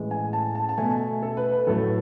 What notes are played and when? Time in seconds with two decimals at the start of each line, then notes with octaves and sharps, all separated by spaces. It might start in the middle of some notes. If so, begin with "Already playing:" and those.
Already playing: A2 E3 G#3
0.11 G#5
0.33 A5
0.55 A5
0.69 A5
0.78 B2 A3 G#5
1.22 A4
1.37 B4
1.52 B4
1.67 A2 F#3 A3 A4